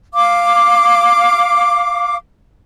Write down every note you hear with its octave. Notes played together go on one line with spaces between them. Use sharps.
F5 D6